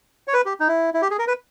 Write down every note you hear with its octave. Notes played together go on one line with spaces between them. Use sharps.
C#5
B4
G4
D#4
E4
E4
G4
G#4
A#4
B4